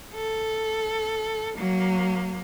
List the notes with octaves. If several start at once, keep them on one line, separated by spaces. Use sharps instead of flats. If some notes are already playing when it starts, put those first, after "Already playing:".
A4
F#3 A#3